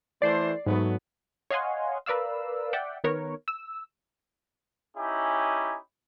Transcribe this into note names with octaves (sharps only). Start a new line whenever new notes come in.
E3 A3 C5 D5 C7
G#2 F#3 A3 B3
C#5 D#5 F5 F#5 G#5 C6
A#4 B4 D5 F5 E6
D5 E5 F#5 G5
D#3 B3 A#4 B4 C#5
E6
C#4 D#4 E4 G4 G#5